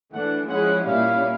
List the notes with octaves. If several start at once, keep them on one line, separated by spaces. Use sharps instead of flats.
E3 A3 D4 F#5
F3 G#3 C#4 E4 G#4 F#5
A#2 G3 A#3 C#4 E4 F5